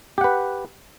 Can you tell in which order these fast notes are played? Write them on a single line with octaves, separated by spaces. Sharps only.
G4 F#5 B4